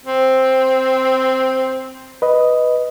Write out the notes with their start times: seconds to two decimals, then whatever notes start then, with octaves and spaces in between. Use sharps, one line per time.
0.06 C4
2.22 B4 D#5